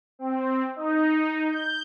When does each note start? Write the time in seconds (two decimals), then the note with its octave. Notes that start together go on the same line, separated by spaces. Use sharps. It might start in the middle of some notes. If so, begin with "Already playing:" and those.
0.19 C4
0.76 D#4
1.49 G6